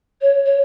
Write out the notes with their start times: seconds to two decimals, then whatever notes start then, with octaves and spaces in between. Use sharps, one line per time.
0.21 C#5
0.45 C#5